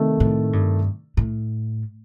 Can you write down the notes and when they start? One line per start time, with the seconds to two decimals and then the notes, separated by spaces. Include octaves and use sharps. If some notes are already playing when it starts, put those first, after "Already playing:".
Already playing: C3 D#3 A3 D#4
0.20 A2
0.53 G2
1.17 A2